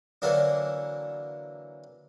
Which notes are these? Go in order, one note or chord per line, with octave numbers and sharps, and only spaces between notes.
D3 E3 F#3 A#3 D4